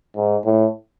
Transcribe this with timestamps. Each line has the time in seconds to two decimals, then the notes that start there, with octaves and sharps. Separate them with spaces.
0.16 G#2
0.45 A2